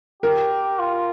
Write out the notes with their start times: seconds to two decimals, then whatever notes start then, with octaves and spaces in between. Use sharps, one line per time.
0.23 G4 A#4
0.79 F4